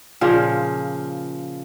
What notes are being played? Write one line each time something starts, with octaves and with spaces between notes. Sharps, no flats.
A#2 C#3 F3